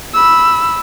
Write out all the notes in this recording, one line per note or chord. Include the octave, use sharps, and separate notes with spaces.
B5 E6